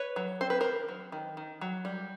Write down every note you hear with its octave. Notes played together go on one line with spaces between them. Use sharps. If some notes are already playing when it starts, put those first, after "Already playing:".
Already playing: B4 C#5
F#3
C4 C5
B4
D#3 A#4 C5
F#3
D#3
D#3
F#3
G3